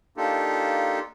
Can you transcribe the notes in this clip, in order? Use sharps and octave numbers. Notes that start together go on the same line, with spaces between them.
A#3 D4 D#4 F4 G4 A4